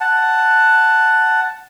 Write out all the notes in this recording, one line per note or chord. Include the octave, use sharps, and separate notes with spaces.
F#5 A5